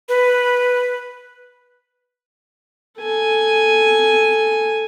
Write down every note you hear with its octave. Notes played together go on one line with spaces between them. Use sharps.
B4
A4 G#5